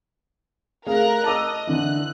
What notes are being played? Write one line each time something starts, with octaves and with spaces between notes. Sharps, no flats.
A3 G#4 A#4 F5 A#5 F#6
D#5 A5 D6 E6
D3 E3 F#6